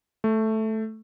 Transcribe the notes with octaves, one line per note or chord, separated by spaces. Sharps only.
A3